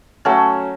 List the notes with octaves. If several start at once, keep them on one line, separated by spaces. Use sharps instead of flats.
F#3 A3 C#4